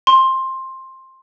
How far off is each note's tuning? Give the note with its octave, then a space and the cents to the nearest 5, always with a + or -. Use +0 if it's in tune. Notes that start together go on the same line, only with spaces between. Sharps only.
C6 +15